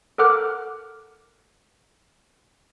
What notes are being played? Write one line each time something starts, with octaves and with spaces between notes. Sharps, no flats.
A4 A#4 F#5 D6 F6 F#6